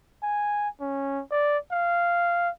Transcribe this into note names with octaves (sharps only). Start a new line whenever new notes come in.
G#5
C#4
D5
F5